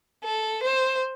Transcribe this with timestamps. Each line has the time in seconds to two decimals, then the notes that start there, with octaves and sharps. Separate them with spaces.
0.24 A4
0.64 C5